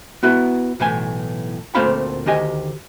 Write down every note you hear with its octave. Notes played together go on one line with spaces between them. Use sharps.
B3 E4 F#4 B4
B1 A2 E3 G#5
D2 A#2 A3 C4 F5 B5
D2 D#3 G4 D#5 G#5